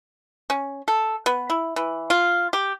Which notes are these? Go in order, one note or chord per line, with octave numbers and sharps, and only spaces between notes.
C#4
A4
B3
E4
E3
F4
G4